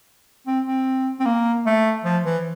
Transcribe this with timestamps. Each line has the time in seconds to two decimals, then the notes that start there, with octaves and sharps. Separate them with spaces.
0.47 C4
0.68 C4
1.20 C4
1.25 A#3
1.66 A3
2.05 F3
2.24 E3